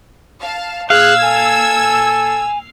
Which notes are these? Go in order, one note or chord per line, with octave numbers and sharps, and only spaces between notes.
F5 A5
A#2 G#4 F5 E6 F#6 G#6
A4 G#5